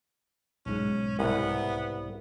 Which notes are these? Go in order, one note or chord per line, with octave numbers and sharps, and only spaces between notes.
B1 G#2 C#4
C2 B3